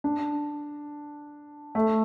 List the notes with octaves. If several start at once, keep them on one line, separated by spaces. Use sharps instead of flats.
D4
A3